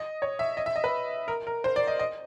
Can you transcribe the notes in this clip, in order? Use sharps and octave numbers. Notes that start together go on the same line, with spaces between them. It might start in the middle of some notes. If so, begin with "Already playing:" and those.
Already playing: D#5
C#5
E5
D#5
E5
D#5
B4
A#4
A#4
C5
D5
D#5
D#5